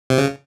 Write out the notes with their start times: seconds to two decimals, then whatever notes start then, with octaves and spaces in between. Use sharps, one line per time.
0.10 C3
0.18 C#3